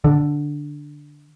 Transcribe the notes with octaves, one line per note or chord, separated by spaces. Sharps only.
D3